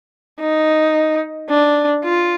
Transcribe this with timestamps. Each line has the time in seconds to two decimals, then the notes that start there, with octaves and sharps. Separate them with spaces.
0.41 D#4
1.49 D4
2.04 F4